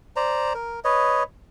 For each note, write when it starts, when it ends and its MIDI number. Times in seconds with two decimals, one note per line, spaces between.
0.16 0.53 72
0.16 0.53 74
0.16 0.53 82
0.55 0.80 70
0.84 1.23 71
0.84 1.23 73
0.84 1.23 75